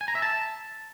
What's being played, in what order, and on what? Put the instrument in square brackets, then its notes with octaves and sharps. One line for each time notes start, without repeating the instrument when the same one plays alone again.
[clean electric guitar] G#5
A#5
E5
A5